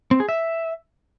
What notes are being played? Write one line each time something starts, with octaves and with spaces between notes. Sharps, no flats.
C4
G#4
E5